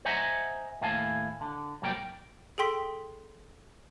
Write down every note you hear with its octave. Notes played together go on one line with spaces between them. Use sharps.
C5 D#5 E5 F#5 G#5 A#5
D#2 A2 F5 G#5 A5
D3
C2 G#2 F#3 G3 A#3 G5
G#4 A4 G5 C6 B6